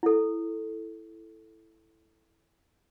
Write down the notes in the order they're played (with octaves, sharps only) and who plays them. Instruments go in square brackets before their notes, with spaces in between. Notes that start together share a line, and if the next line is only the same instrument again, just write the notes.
[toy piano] E4 A4